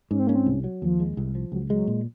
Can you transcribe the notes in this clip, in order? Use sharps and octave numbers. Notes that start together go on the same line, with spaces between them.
G#2 C#4
C4
A#3 C#4
C4
C2
F#3
D#2 F3
G#3
C2
F3
C#2 F#3
F#3 G#3
A#2